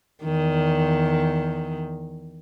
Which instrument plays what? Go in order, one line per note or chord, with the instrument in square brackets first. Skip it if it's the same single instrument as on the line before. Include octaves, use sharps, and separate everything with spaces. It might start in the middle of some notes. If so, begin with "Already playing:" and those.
[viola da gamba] E2 D#3